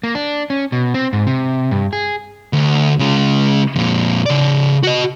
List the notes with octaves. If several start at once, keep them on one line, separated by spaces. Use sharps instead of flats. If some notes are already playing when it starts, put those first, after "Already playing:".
A#3
D4
C#4
B2
C4
G#2
C3
G2
G#4
D2
C#3 G#3
F2 A#2
C#3 D5
F#4 D#5